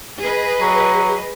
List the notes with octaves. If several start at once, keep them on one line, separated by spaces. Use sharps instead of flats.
G#4 B4 D#5
F#3